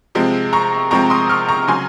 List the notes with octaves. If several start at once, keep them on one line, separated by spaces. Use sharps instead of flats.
C3 F3 G#3 C4
A#5 C#6
C3 F3 G#3 C4 A#5 C#6
C6 D#6
C#6 F6
A#5 C#6
C#3 F#3 G#5 C6